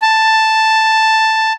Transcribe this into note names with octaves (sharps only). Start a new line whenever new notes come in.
A5